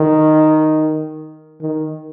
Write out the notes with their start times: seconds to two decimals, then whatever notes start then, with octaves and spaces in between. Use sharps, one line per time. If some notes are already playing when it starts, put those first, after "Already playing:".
Already playing: D#3
1.61 D#3